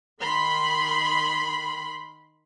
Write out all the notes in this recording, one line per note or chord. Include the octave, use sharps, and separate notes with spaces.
D#3 B5 C6